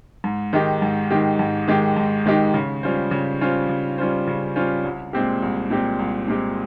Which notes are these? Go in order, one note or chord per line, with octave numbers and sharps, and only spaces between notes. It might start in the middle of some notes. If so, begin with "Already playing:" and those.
G#2
D#3 G#3 D#4 G4
G#2
D#3 G#3 D#4 G4
G#2
D#3 G#3 D#4 G4
G#2
D#3 G#3 D#4 G4
C#3
G3 C#4 F4 C5
C#3
G3 C#4 F4 C5
C#3
G3 C#4 F4 C5
C#3
G3 C#4 F4 C5
C2
A#2 G#3 C4 G4
C2
A#2 G#3 C4 G4
C2
A#2 G#3 C4 G4